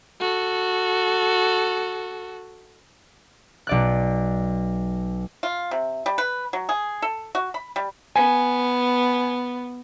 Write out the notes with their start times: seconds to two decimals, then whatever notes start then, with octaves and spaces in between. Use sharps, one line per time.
0.21 F#4 A4
3.67 B1 D5 F#6
5.43 F4
5.71 C3
6.06 G3
6.18 B4
6.53 F#3
6.69 G#4
7.02 A4
7.35 F#4
7.54 B5
7.76 G3
8.16 B3 G#5